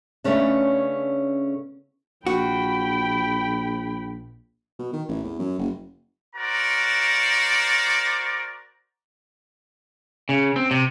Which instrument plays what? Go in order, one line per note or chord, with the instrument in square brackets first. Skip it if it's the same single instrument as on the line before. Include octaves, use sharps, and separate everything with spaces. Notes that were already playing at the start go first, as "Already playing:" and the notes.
[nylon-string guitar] C#3 A3 B3 C#4 D4
[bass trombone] A#1 [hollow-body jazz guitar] F#4 [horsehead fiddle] G5 B5
[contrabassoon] B2
D#3
A1
E2
F#2
F#1
[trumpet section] F#4 A#4 C5 D5 A#5
[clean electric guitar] C#3
C4
C3